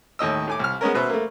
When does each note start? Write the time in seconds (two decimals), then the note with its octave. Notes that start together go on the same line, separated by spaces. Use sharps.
0.19 D#2 A2 D#5 E6
0.47 A2 G#5 D6
0.60 C2 F6
0.81 G#3 B3 C#4 A#4
0.94 B2 B4 C5 E5
1.10 A3 A#3